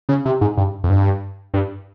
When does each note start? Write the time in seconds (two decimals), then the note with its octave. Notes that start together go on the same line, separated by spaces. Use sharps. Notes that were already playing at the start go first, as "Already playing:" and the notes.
0.09 C#3
0.25 C3
0.41 G#2
0.57 G2
0.84 F2
0.90 G2
1.54 G2